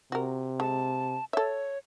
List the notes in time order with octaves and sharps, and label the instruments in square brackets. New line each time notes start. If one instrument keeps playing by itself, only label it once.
[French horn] C3 [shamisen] F#4 A#4
[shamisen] G#3 [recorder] A5
[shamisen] A4 E5 [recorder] C#5